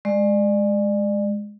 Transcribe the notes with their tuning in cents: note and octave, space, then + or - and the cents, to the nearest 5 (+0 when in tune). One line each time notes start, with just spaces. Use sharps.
G#3 +0 D5 +35